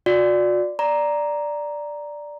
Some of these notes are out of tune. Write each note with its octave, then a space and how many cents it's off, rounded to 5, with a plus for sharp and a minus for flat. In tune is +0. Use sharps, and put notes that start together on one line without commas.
F#4 -40 D5 +0
D5 +0 A#5 +0